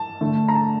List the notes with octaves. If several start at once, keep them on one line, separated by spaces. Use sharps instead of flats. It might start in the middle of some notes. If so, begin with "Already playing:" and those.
Already playing: A5
D3 A3
A#5
A5